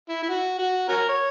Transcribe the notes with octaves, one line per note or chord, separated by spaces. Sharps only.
E4
E4
F#4
F#4
C#4 F#4 A#4
C#5